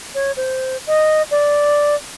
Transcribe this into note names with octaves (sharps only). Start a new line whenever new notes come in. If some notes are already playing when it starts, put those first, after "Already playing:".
C#5
C5
D#5
D5